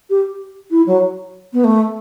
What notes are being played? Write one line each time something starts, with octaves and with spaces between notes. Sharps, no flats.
G4
E4
F#3
B3
A3